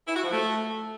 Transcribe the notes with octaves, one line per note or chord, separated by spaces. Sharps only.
E4
F#4
F3
A3